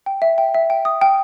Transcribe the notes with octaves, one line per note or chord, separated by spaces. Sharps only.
G5
E5
G5
E5
G5
D#6
G5